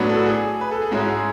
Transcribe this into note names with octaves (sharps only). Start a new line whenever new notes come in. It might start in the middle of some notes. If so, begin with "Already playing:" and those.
Already playing: A2 F#3 B3 D4
A4
F#4
G#4
B4
A4
G#4
G#2 G#3 C#4 E4 F#4
G#4